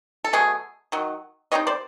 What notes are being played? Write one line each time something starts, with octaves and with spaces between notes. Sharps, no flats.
A4
B2 F#3 A3 G#4
D#3 F#3
G3 C4 D#4 C#5 D#5
C5 D5